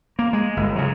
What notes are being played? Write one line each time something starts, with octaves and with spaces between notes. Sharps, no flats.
A#3
G#3
G1
C#3 F#3